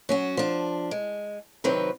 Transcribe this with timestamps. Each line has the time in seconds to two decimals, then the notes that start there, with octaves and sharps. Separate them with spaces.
0.09 F#3 C#4 F#4
0.37 F3 D4
0.91 G#3
1.64 C3 D#3 F#3 C4 B4